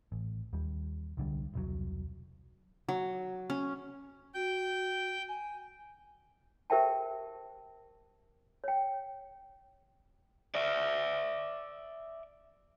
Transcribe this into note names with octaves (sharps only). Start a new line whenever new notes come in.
A1
D#2 G3
C2 D3 G3
E1 C2 F#3
F#3
C#4
F#4 G5 G6
G#5
G4 A#4 C5 E5 G5 A5
C#5 G5
D5 E5